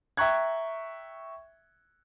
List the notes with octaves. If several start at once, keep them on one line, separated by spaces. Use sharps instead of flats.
E5 G5 A#5 C#6 F#6 G#6